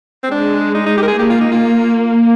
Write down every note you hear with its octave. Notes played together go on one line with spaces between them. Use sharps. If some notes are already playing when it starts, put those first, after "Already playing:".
C4
G#3 D4
D#4
D#4
G4
A#4
G#4
A#3 G4
F4
D#4
F4